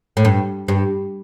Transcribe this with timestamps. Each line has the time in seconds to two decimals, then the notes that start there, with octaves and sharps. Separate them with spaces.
0.17 A2
0.25 G2
0.68 G2